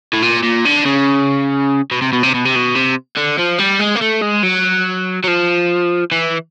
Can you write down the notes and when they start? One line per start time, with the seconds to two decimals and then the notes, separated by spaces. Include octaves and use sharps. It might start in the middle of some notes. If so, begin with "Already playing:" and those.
0.13 A2
0.22 A#2
0.43 A#2
0.65 D3
0.85 C#3
1.91 B2
2.02 C3
2.13 B2
2.23 C3
2.34 B2
2.45 C3
2.56 B2
2.75 C3
3.17 D3
3.39 F3
3.59 G3
3.80 G#3
3.96 A#3
4.02 A3
4.22 G#3
4.43 F#3
5.24 F#3
5.27 F3
6.12 E3